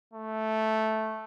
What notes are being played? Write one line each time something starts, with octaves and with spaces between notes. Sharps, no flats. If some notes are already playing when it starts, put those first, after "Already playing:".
A3